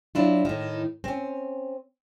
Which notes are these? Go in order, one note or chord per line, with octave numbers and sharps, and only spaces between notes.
F#3 D4 E4 F4
A2 D#3
C4 C#4